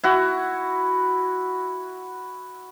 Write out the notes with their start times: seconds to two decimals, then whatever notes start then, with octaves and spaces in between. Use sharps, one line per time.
0.04 E4 F#4